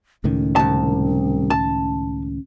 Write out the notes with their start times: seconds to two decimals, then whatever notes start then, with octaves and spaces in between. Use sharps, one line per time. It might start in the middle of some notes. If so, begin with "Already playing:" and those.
0.24 C#2 A2 D#3 C#4
0.56 C2 A5
1.50 A5